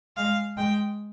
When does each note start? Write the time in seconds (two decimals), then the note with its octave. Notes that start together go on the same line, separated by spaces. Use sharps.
0.17 G#3 F5
0.57 G#3 G5